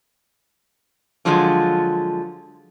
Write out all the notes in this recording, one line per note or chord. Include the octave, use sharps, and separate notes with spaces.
D3 F3 F#3 G#3 F4